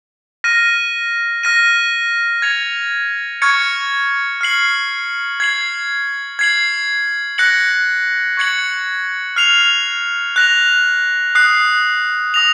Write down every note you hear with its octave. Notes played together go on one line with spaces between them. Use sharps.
F6 A#6 D#7
F6 A#6 D#7
G#6 C#7 F7
C#6 F6 G#6 C#7
F6 C7 F#7
G#6 C7 F#7
G#6 C7 F#7
F#6 A#6 C#7 F#7
C#6 G#6 C#7 F#7
F6 C7 F7
F#6 A#6 F7
D#6 F#6 C7
D#6 A#6 F7